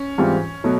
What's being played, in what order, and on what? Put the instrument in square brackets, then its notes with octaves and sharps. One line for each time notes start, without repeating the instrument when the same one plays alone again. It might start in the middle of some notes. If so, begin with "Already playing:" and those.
Already playing: [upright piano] C#4
[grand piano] G#2 E3 G3 C4 F4
B2 F#3 A3